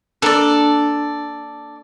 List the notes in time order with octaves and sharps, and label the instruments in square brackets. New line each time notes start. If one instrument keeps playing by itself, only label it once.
[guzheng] A#3 D4 [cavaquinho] A4 D5